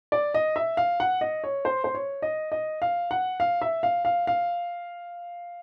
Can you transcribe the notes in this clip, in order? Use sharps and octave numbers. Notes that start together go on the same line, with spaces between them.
D5
D#5
E5
F5
F#5
D#5
C#5
C5
C5
C#5
D#5
D#5
F5
F#5
F5
E5
F5
F5
F5